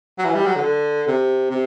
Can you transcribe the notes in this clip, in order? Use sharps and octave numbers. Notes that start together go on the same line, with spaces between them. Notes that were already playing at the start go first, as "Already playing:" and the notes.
F#3
E3
G3
F#3
D3
C3
C3